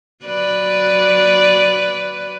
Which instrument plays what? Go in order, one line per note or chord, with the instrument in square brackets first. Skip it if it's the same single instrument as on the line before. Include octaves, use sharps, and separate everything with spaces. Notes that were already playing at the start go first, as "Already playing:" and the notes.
[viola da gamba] F#3 B4 D5